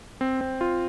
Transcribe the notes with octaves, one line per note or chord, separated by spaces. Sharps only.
C4
C4
F4